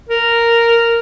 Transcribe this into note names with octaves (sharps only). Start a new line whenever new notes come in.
A#4